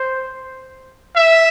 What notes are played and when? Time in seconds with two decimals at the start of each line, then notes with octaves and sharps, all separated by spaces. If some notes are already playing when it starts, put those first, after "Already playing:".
Already playing: C5
1.15 E5